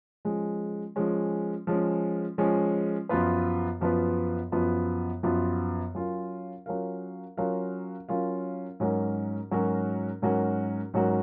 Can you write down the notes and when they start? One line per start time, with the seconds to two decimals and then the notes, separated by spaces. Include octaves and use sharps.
0.25 F3 G#3 C#4
0.96 F3 G#3 C#4
1.67 F3 G#3 C#4
2.38 F3 G#3 C#4
3.09 F#2 F3 B3 F4 B4
3.81 F#2 F3 B3 F4 B4
4.52 F#2 F3 B3 F4 B4
5.23 F#2 F3 B3 F4 B4
5.95 F#3 C#4 F4 A#4 F5
6.66 F#3 C#4 F4 A#4 F5
7.37 F#3 C#4 F4 A#4 F5
8.09 F#3 C#4 F4 A#4 F5
8.80 G#2 F#3 C#4 F#4 A#4
9.51 G#2 F#3 C#4 F#4 A#4
10.22 G#2 F#3 C#4 F#4 A#4
10.94 G#2 F#3 C#4 F#4 A#4